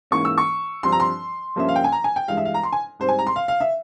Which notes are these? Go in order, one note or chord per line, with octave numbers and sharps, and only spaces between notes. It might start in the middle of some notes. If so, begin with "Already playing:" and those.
G#2 E3 A#3 C#4 C#6
E6
C#6
G2 F3 C4 C6
A#5
C6
G2 F3 A#3 C#4 E5
F5
G5
G#5
A#5
G#5
G5
G2 E3 G#3 F5
E5
F5
A#5
C6
G#5
G#2 G3 C4 C5
G#5
A#5
C6
F5
F5
E5